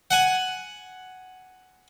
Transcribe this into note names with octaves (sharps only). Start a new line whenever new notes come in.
F#5 G#5